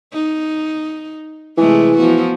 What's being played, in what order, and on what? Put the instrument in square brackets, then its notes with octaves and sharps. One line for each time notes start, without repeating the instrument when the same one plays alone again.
[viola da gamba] D#4
[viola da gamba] C3 G#3 A3 [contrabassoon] E3
[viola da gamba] F3 B3 F#4